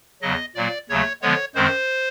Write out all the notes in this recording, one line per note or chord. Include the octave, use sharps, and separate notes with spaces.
E2 C#3 F#3 D#5
A#2 F#3 A#3 D5
D#2 C#3 F#3 A3 C#5
D3 F3 G#3 B3 C#5
F#2 D#3 G#3 C4 C5